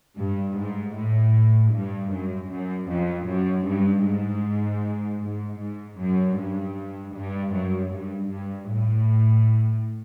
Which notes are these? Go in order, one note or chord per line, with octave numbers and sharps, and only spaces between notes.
G2
G#2
A2
G2
F#2
F#2
F2
F#2
G2
G#2
G#2
G#2
F#2
G2
G2
F#2
G2
G2
A2